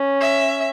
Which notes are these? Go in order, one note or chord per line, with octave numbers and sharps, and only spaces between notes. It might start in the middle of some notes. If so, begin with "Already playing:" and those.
Already playing: C#4
E5